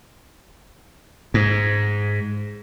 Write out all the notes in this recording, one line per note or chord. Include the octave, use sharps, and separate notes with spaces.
G#2